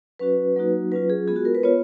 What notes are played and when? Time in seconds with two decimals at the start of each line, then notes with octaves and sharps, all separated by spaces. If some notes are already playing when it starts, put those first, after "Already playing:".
0.19 F#3 C#4 F#4 B4
0.56 F#3 A#3 D#4 F#4
0.92 F#3 C#4 F4 B4
1.10 G#4
1.28 G#3 B3 F4 G#4
1.36 F#4
1.45 A#4
1.55 B4
1.63 B3 F4 C#5